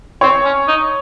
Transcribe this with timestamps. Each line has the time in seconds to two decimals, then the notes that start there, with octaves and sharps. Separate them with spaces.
0.21 C4 C#5
0.45 C#4
0.68 D#4